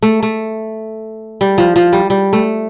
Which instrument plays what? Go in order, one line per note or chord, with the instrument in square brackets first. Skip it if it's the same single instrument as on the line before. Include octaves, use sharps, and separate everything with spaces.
[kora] A3
A3
G3
F3
F3
G3
G3
A3